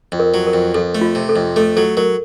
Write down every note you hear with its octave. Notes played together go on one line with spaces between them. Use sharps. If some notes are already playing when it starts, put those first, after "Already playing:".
F2
A#4
F#3
A#4
F2
F2 A4
A3
F4
C3
A4
F2
A3 A4
F#3 A4
F#3 A#4